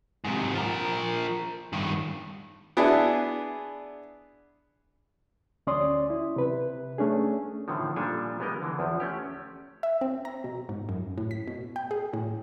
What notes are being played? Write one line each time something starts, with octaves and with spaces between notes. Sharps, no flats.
G#2 C3
F3 A#4
G2 D#3
B3 D4 E4 G#4
D2 C#4 D5 C6 D#6
E4
C3 B4
A3 C#4 D4 G#4
A2 D3 D#3 F3
A#2 F3 G3 D4 A4 G#5
G3 G#3 B3 A#4 D#5
D3 E3
E2 F3
A3 C#4 G4
E5
C4
A#5
B2
G#2
F#2
A2
B6
B2
G5
G#4
A2